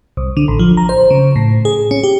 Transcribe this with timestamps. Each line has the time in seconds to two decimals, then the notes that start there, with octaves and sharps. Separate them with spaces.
0.17 C2
0.37 D3
0.48 A1
0.59 F3
0.77 A#5
0.89 C5
1.10 C#3
1.36 A2
1.65 G#4
1.91 C#4
2.03 G4